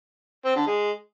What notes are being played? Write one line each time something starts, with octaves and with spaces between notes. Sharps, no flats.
C4
D3
G#3